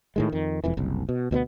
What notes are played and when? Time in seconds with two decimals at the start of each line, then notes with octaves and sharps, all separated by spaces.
0.16 A2 D#3 G#3
0.32 F2 D#3
0.64 E1 F2 E3
0.77 F#1 C2
1.09 B2
1.31 D2 B2 F3 B3